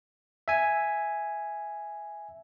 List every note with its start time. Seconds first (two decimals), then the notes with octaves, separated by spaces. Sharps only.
0.48 E5 G#5